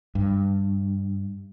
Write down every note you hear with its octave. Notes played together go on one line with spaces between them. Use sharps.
G2